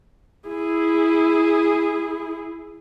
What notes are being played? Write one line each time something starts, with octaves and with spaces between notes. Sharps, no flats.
E4 G#4